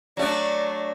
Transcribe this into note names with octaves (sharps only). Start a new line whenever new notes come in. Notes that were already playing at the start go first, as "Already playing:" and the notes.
F#3 A3 D4 D5